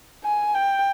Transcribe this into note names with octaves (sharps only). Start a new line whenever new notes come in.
G#5
G5